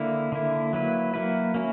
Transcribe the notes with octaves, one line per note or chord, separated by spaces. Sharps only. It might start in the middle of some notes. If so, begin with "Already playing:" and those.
Already playing: D3 A#3 E4
D3 A#3 E4
F#3 A#3 E4 B4
F#3 A#3 E4 B4
A#3 C#4 E4